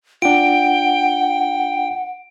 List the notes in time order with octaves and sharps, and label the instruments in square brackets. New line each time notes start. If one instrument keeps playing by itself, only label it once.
[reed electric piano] D4 F4 [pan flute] F#5 [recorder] G5 [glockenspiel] D7